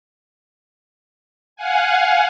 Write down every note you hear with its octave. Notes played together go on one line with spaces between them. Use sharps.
F5 F#5 G#5